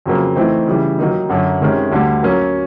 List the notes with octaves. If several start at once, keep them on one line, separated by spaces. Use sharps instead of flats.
F2 C#3 F#3 A#3
E3 A3 C4 D#4
C#3 E3 G3
D#3 F#3 A#3 D#4
F#2 D3 F#3
C3 D#3 G#3 C#4
D2 D3 G3
F#3 A#3 C#4